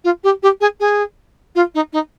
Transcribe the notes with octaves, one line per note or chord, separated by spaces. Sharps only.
F4
G4
G4
G#4
G#4
F4
D#4
D#4